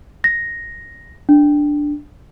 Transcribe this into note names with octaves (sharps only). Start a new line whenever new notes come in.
A#6
D4